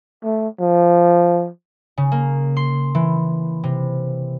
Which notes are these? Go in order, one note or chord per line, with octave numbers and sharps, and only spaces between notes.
A3
F3
C#3
A#3
C6
E3
C3